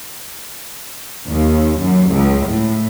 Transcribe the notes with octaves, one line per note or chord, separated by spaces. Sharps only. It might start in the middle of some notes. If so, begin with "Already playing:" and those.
D#2
F#2
C#2
A2